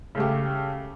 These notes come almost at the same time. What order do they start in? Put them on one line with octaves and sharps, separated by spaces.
C#3 A3 G4